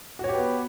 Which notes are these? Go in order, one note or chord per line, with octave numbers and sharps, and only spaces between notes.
B3 F#4 G4 B4 C#5